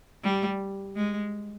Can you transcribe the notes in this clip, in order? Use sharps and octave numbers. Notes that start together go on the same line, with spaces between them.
G3
G#3